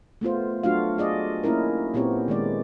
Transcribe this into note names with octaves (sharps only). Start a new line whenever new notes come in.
A3 B3 F4 C5
F#3 A3 D4 F4 F#4 F5
G#4 D5 D#5
A#3 C#4 D#4 E4 A#4
A#2 B3 C4 E4 G4 C#5
D#3 G#3 D5